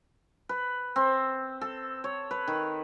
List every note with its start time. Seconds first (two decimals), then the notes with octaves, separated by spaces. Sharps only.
0.49 B4
0.96 C4
1.61 A4
2.04 C#5
2.31 B4
2.48 D#3